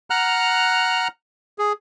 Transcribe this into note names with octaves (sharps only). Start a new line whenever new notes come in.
F#5 A#5 F6 F#6
G#4